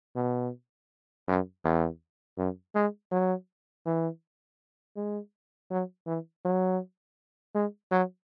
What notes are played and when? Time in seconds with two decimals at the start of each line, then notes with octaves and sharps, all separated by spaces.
0.16 B2
1.28 F#2
1.64 E2
2.38 F#2
2.75 G#3
3.11 F#3
3.86 E3
4.96 G#3
5.71 F#3
6.07 E3
6.45 F#3
7.54 G#3
7.91 F#3